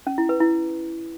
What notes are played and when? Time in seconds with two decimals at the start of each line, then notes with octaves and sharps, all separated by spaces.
0.07 C#4
0.18 E4
0.29 B4
0.40 E4